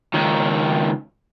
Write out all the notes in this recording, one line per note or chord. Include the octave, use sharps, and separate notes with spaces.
C#2 D#3